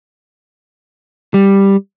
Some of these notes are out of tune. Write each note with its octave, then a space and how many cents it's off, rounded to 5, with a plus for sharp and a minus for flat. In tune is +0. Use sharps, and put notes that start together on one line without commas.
G3 +5